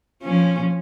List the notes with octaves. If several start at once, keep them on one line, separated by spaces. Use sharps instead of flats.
F3 C#4